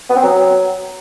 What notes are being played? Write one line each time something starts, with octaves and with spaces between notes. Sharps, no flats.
B3
C4
F#3